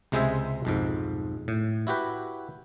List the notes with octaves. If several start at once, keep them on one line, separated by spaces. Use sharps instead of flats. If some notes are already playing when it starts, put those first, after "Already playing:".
C#2 C3 G#3 G#4 C5 E5
B1 F2 G#2
A2
E4 F#4 G4 B4